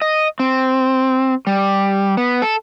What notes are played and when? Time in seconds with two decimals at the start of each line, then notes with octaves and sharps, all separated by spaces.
0.02 D#5
0.40 C4
1.47 G3
2.17 B3
2.42 A4